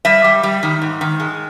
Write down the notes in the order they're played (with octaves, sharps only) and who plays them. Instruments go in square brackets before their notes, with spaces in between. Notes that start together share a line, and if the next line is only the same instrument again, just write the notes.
[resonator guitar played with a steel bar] G3 E5
G3
G3
D#3
G#2
D#3
G#3